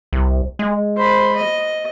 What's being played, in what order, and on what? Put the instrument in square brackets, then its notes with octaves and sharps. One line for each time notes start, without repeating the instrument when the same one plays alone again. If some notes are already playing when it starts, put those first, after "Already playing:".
[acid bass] C2
G#3
[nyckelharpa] C5 B5
D#5